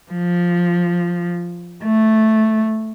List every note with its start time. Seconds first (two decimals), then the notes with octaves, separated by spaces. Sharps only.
0.12 F3
1.84 A3